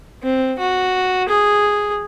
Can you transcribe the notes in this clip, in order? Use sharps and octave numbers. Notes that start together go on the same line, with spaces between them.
C4
F#4
G#4